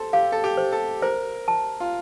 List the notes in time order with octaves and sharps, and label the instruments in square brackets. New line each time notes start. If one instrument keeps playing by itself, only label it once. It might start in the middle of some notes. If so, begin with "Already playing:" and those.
Already playing: [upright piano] A4 C5
[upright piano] G4 [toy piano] F5
[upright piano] A4
G4
[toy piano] C5
[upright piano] A4
[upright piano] A#4 [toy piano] C5
[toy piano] A5
[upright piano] F4